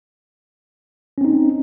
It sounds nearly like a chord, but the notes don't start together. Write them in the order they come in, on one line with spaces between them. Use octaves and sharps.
C#4 C4 D#4